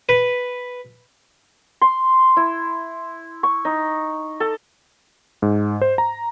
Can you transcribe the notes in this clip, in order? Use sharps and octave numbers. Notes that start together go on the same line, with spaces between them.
B4
C6
E4
C#6
D#4
A4
G#2
C5
A#5